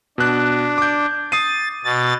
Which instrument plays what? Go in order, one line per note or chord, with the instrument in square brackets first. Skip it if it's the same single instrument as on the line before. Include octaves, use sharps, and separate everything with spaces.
[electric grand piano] B2 F#6 [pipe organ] D4
[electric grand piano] D6 G6
[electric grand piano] D#6 C7 D#7 [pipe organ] A6
[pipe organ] B2 A6